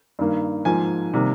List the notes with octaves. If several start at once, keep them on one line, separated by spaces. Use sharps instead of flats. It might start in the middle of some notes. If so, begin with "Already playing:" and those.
G2 D#3 A#3
G#2 F3 A#3 G#5
C3 D#3 G3 A#3